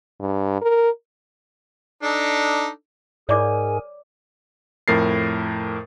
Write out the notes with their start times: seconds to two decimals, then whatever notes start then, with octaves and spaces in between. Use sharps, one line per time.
0.20 G2
0.62 A#4
2.03 D4 D#4 A4
3.29 G#2 G#4 A#4 C#5 D5 G#5 D6
4.88 F2 A2 A#4 A6 C7